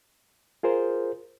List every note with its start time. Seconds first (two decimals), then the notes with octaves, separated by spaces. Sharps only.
0.63 F4 G#4 A#4 C5